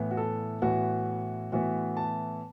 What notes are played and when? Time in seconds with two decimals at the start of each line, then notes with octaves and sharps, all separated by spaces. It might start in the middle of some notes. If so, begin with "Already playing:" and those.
Already playing: A2 E3 B3
0.11 F#4
0.17 A4
0.62 A2 E3 B3 F#4
1.52 A2 E3 B3 F#4
1.97 A5